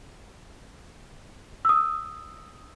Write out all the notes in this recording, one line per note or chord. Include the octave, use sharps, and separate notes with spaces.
D#6 E6